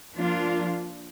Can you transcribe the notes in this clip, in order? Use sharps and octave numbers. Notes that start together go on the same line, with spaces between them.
F3 A#3 D4 F4